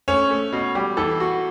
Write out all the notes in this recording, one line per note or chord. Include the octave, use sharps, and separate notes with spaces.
A3 C#4
A3
B2
G3
E3 A4
F#4